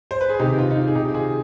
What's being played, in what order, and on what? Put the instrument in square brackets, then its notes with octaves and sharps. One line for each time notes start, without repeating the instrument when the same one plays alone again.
[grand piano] C5
B4
G#4
C3 D#3 D#4 G4
F4
D#4
F4
G#4
C3 D#3 D#4 G4
G4
F4 G#4